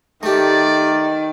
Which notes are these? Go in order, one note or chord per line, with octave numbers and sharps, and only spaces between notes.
D#3 A3 G4 D5